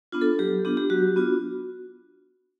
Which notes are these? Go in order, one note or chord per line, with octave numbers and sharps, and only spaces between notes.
B3 D4 F4
A4
F#3 G4
B3 D4 F4 G4
G4
F#3 F#4
B3 D4 F4